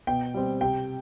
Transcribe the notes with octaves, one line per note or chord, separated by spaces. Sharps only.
B2 G5
G3 C4
C3 G5